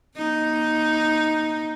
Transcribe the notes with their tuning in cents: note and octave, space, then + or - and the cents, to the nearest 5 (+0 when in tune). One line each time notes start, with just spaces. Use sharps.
A#3 +40 D#4 +0